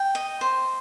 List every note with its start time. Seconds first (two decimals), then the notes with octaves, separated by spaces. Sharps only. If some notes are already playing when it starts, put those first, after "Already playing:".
Already playing: G5
0.15 D#5
0.41 C5